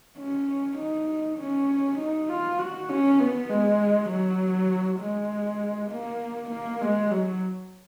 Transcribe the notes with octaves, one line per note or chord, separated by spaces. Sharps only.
C#4
D#4
C#4
D#4
F4
F#4
C#4
B3
G#3
F#3
G#3
A#3
A#3
G#3
F#3